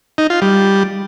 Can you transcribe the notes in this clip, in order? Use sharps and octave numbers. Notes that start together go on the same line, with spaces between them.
D#4
F4
G3